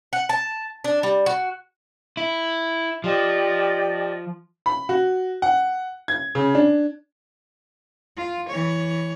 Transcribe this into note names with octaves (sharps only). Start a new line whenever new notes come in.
F#5
A5
D4
G3
F#4
E4
F3 G4 D5 D#5
B5
F#4
F#5
G#6
C#3
D4
F4
E3 C#5